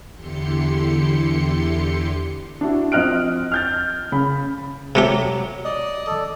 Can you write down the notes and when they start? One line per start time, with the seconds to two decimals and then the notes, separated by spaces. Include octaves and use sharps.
0.14 E2 D3 E3 G4 C6 C#7
2.61 D4 E4 F#4
2.92 F3 C4 D#5 F6 F#6 D7
3.52 F6 G6 A6
4.12 C#3 B5
4.95 C3 F#3 A3 G4
5.65 D5 D#5 D#6
6.07 A4 D5